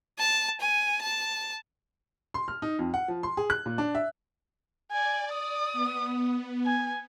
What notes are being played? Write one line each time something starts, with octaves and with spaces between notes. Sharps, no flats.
A5
G#5
A5
C6
F6
D#4
F2
F#5
F3
C6
G#4
F#6
A#2
D4
E5
D5 G#5
D#6
B3
G#5